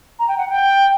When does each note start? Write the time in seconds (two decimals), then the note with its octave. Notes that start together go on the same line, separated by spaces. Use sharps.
0.19 A#5
0.28 G5
0.38 F#5
0.49 G5